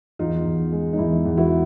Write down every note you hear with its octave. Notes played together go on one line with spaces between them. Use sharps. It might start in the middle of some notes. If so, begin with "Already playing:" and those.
E2 D#4 F4
E2
G#3
D#4
E2 E4
E2
E4 F#4